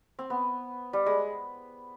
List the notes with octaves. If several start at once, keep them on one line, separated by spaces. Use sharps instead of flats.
C4
B3
G3
G#3